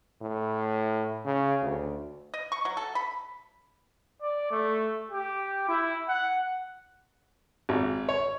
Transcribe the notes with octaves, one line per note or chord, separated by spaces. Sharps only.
A2
C#3
D2
D#5
C#6
F#3
A4
B5
D5
A3
G4
E4
F#5
G#1
C#5